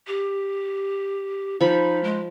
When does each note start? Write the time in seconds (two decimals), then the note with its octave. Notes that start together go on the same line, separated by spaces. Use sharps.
0.07 G4
1.61 F3 D#4 B5
2.04 G#3